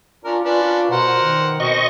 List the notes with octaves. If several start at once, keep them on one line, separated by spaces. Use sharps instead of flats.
C#4 D4 F4 A#4
C#4 D4 F4 B4
F4
B2 A#4 C5 F#5
D#3
B2 C4 D#5 C#6